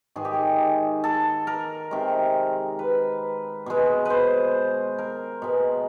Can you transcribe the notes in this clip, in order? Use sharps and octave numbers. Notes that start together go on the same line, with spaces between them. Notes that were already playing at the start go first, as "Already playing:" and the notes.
G#2 D#3 G#3 G#4
G4
G#4
A4
A#4
C3 D#3 G#3
B4
B2 G#3
B4 C5
A#4
B2 G#3